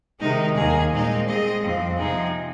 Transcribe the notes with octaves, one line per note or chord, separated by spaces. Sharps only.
C3 D#3 G#3 D#4
D#2 D#3 A#3 G#4
A#2 G#3 C4 D#4
G#3 C4 G#4 D#5
F2 F3 C4
C3 F3 C4 D#4 G#4